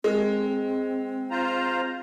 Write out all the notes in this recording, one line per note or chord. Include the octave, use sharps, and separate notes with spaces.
G#3 C4
F4 C5 A#5